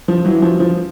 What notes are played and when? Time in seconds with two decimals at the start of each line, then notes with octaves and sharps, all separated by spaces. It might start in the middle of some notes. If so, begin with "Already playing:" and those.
0.08 F3
0.25 E3 F#3
0.42 F3
0.60 F3